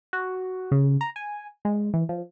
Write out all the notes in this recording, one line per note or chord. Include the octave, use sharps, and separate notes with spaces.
F#4
C#3
A#5
G#5
G#3
E3
F3